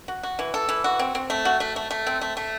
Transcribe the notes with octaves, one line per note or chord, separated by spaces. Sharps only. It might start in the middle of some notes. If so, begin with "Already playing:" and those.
F#4
F#4
E3
A4
E3
F#4
C4
C4
A3
F#4
A3
A3
A3
C4
A3
A3